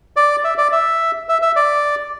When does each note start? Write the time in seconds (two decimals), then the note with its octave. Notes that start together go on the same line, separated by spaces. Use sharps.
0.16 D5
0.44 E5
0.58 D5
0.72 E5
1.29 E5
1.42 E5
1.56 D5